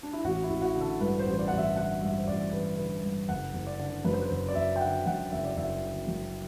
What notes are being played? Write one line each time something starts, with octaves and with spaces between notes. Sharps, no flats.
D4
E4
A1 F#4
E4
A1
F#4
D3
A4
G2 B4
C5
A1
C5
D5
A1 F#5
E5
D3 F#5
G2 E5
C5
A1 D5
A1 B4
D3 B4
G2
F#1 F#5
F#1
D5
D3
F#2 B4
C5
B4
F#1 C5
D5
F#1 E5
G5
D3 F#5
F#2 F#5
F#1 E5
D5
F#1 E5
D3
F#2